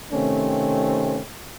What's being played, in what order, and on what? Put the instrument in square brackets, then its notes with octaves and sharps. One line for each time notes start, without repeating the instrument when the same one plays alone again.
[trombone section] C3 D#3 A3 C4 C#4